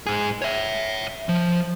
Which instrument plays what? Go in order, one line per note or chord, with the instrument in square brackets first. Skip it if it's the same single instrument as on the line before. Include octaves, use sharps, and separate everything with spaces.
[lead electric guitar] G#2 G#4
C#5 E5
F3